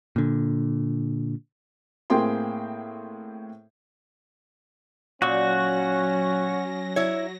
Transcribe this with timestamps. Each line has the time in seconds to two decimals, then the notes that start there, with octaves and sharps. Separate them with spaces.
0.16 A#2 D3
2.10 A2 A#3 C4 G#4 G5 C6
5.22 A#2 F#3 C#4 F#4 C#6 A#6
6.96 E4 C#5